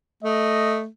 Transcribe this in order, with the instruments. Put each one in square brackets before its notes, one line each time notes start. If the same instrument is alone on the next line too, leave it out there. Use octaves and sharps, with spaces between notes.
[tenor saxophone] A3 [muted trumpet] D#5